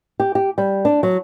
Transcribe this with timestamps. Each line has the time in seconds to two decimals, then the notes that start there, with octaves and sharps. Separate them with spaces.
0.20 G4
0.35 G4
0.58 G3
0.85 D4
1.03 F#3